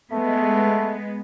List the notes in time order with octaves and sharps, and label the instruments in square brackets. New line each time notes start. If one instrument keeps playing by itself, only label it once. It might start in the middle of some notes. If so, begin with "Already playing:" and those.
[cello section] G#3 B3 [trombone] A3